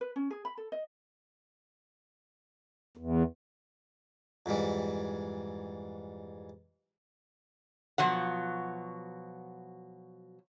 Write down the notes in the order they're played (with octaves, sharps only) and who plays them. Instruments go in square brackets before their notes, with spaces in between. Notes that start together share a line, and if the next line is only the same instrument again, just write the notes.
[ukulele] B4
C#4
G#4
B5
A4
D#5
[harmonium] E2
[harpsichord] F2 G#2 E3 G3
[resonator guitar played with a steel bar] B2 F3 F#3 F#5